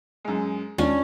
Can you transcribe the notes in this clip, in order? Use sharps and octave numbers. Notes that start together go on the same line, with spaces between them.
F#2 G#3
D#2 G#3 C#4 D4 F4